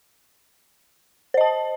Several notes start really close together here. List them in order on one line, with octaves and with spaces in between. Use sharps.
C5 D#5 A5